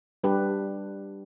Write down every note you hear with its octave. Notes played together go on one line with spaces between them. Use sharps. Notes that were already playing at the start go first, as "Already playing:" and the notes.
G3 D4 G4 B4